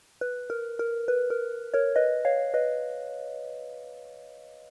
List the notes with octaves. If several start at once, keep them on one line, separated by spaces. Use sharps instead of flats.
B4
A#4
A#4
B4
A#4
A#4 C#5
B4 D#5
C#5 F5
B4 D#5